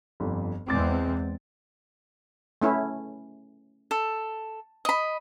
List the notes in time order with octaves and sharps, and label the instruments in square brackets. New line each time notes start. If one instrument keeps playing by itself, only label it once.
[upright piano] G1 F2
[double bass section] E2 G#3 C4 [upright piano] D6 A6
[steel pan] A3 C#4 E4
[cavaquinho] A4
D#5 B5